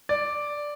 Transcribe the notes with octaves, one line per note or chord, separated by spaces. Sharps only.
D5